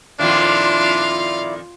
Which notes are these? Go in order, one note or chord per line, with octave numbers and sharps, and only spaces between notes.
F2 A#2 D#3 D4 E4 F4 D5 F5